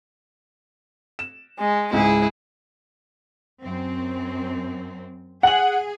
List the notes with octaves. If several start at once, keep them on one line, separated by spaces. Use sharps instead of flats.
E7
G#3
C#2 G#2 E4 G#4
F#2 C4
G#4 F#5 F#7